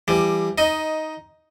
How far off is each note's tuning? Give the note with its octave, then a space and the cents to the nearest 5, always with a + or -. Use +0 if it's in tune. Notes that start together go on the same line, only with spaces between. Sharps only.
E3 +35 G3 +15
D#4 +10 D#5 +0